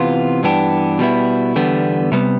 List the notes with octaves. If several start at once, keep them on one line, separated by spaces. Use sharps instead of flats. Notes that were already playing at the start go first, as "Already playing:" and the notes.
Already playing: C3 E3 B3 F4
G2 E3 B3 D4 G4
B2 G3 B3 E4
E2 D3 G3 B3
C3 G3 B3